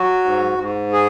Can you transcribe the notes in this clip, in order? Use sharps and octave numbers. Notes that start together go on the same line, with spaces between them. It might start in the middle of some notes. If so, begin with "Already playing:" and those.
Already playing: F#3 F#4
G#2
G#2
G#4